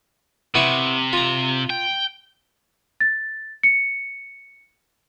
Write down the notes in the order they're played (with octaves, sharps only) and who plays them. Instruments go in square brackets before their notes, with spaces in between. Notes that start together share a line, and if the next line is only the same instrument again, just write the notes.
[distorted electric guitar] C3 [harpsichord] B3 E4 C#6
[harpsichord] F4 A#5
[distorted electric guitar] G5
[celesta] A6
C#7